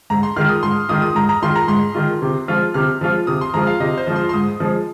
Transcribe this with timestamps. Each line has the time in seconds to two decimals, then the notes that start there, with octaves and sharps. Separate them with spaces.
0.10 G#2 A#5
0.23 C6
0.36 D#3 G#3 F4 F6
0.49 D#6
0.63 G#2 C6
0.89 D#3 G#3 F4 D#6
1.02 D#6
1.15 G#2 A#5
1.29 A#5
1.42 D#3 G#3 F4 C6
1.55 A#5
1.68 G#2 C6
1.94 D#3 G#3 F4
2.22 C3
2.48 F3 G#3 F4
2.74 C3 F6
3.01 F3 G#3 F4
3.27 C3 D#6
3.41 C6
3.54 F3 G#3 F4 A#5
3.67 F5
3.80 C3 D#5
3.98 C5
4.07 F3 G#3 F4
4.16 C6
4.29 C6
4.33 G#2 D#6
4.60 F3 G#3